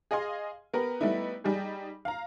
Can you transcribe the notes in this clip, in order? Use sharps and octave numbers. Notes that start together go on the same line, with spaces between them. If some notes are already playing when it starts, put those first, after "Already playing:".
G#4 D#5 F5 G#5 C6
B3 G4 A#4 B4
G3 A3 B3 D#4 E4
G3 D#4 G4 G#4
F5 A#5